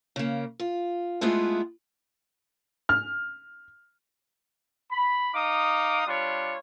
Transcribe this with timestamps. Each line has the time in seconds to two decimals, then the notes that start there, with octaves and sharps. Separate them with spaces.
0.16 C#3 A#3
0.60 F4
1.21 G#3 A3 B3 E4 F4 G#4
2.89 F6
4.92 B5
5.34 D#4 F5 D6 D#6
6.07 G3 D4 F4 C#5